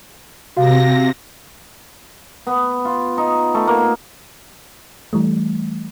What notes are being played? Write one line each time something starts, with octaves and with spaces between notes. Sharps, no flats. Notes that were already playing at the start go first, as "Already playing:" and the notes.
C3 F#4 F5 A#6
B3
F4
D#4
A3
A#3
E3 G3 A3